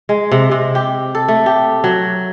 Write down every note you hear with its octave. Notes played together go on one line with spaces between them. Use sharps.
G#3
C3
C3
G4
A4
A3
G4
F#3